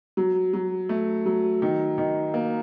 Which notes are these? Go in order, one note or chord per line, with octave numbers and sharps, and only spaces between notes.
F#3
F#3
A3
F#3
D#3
D#3
A#3